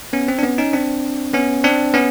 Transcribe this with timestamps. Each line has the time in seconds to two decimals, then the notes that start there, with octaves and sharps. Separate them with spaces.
0.13 B3 C#4
0.28 C4
0.39 D4
0.43 B3 C#4
0.58 C#4 D#4
0.73 C4 D4
1.34 B3 C#4
1.64 C4 D4
1.94 B3 C#4